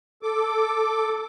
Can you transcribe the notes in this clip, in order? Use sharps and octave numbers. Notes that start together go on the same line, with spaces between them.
A4 D6